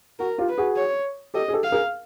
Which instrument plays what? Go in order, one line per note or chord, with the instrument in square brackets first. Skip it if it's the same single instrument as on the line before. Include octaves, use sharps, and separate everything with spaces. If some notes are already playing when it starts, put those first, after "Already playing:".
[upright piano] F#4 [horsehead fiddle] A#4
[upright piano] F4 G4
[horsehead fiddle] B4
[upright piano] F#4 G#4
[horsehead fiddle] C#5
[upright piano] G4 A4 [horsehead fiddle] D#5
[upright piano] G#4
G4 A4
[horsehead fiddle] F5
[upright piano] G#4 A#4